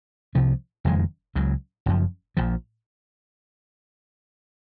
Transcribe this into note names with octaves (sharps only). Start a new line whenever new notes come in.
C2 C3 F3
F#1 F2 D#3 G#3
C#2 C#3 F#3
F#1 F#2 F3
A#1 A#2 F3